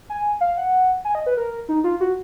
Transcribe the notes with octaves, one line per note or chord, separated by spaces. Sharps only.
G#5
F5
F#5
G#5
D#5
B4
A#4
D#4
F4
F#4